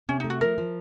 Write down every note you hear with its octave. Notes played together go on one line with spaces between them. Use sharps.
C3 C#4
D#4
A3
F#4
F3 A#4
F3